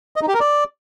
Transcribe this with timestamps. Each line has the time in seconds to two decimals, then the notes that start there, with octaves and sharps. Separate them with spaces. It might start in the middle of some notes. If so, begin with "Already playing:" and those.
0.16 D#5
0.22 D#4
0.28 G4
0.34 A#4
0.40 D5